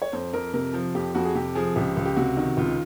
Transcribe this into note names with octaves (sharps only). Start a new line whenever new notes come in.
C#5
F2 C5
F2 A#4
C3 A#4
F3
F2 G4
F2 F#4
G#4
C3 G4
F3 G#4
C#2 G4
C#2
G4
C3 F#4
D#3
C#2 F4